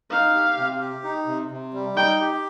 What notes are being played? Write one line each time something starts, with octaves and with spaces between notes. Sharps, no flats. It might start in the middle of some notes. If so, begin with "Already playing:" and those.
D#4 F5
G4
C3
G4
D#4
C3
C3
G3
D#4 G5
G4